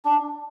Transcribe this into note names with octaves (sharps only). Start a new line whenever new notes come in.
D4